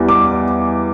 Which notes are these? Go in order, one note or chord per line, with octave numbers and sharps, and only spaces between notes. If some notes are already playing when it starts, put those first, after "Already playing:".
Already playing: E2 E3 G3
D6